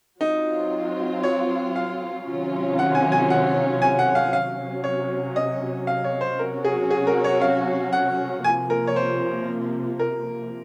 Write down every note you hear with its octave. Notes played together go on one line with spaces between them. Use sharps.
F#3 C4 D#4 F4
C#5
F5
C3 D#3 F#3 C#4 F4
F#5
G#5
G#5
F#5
G#5
F#5
F5
C3 F#3 C#4 F5
C#5
D#5
F5
C#5
C5
C3 F#3 C#4 F#4 A#4
G#4
G#4
A#4
C#5
F5
F#5
C3 F3 A#3 G#5
A#4
C#5
C5
A#4